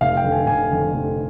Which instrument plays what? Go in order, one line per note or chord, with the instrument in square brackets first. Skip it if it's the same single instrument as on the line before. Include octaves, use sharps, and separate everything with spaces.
[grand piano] F1 F5
G5
F2 D3
G#5
F1 G#5
F2 D3
F1